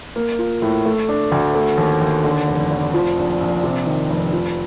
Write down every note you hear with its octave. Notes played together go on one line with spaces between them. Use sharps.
A#3
F4
A2
A3
D4
D2
A3
D#2
D#2
D3
F1
F1
F3
A#1
A#1
C3
D#3
F1
F3